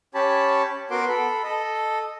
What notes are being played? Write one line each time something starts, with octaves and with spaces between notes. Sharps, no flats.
C#4 G4 C#5 A5 B5
B3 F#4 A#4 C6 D6
A4 B5
A4 D#5